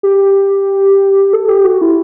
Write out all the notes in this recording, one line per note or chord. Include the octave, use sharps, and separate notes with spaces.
G4
A4
G4
F#4
E4